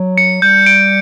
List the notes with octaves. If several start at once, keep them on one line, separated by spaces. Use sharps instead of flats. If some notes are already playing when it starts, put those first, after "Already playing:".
Already playing: F#3
C#7
G3 G6
D7